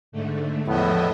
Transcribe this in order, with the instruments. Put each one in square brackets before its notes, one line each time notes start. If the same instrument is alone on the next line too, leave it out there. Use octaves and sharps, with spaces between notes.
[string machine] G#2 D3 A3
[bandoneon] E2 B3 [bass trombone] A2 [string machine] F3 D#5 E5